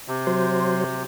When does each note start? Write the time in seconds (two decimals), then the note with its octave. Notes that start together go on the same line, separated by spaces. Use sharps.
0.08 C3
0.27 F#3 C5